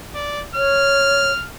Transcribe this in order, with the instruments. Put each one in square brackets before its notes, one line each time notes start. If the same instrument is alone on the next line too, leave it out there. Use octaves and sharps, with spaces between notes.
[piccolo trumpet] D5
[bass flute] C#5 [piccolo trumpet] F6